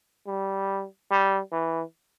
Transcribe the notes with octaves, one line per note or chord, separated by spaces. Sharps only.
G3
G3
E3